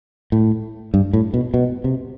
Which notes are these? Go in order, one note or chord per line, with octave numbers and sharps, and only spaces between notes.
A2
G2
A2
B2
B2
C3